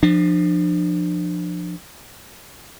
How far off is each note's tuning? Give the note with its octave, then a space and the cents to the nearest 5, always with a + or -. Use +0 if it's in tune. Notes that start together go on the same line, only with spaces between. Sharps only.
F3 +5 D4 +30